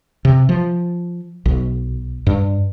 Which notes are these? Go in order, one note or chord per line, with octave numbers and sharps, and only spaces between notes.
C3
F3
B1
G2